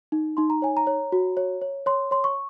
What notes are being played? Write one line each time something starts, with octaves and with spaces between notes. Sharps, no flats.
D#4
D#4 C6
A#5
C#5 G#5
A#5
C#5
F#4
C#5
C#5
C#5 C6
C#5 C6
C#6